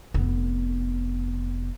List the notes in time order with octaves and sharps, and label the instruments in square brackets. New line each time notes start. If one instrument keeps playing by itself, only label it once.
[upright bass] F1 B3